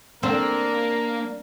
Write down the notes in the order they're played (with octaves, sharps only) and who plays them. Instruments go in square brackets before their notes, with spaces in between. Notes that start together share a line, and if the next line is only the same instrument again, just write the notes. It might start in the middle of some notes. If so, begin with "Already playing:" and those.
[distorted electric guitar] A#3 [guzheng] C4 [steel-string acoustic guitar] D4 [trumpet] A#4